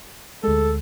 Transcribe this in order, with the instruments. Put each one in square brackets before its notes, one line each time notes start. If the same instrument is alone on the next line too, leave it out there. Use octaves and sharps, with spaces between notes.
[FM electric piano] D2 G#3 [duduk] A4